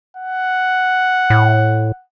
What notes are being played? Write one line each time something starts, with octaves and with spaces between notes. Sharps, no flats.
F#5
A2